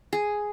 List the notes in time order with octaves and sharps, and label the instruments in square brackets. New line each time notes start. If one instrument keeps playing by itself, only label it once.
[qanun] G#4